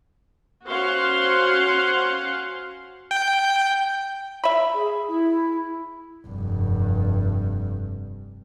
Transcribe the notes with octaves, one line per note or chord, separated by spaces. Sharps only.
C#4 F#4 C5 F5 F#5 C6
G5
E5 B5
G#4
E4
F1 G2